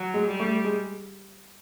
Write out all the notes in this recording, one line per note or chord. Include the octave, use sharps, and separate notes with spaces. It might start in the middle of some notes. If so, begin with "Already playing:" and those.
Already playing: F#3
G#3
G3
A3
G#3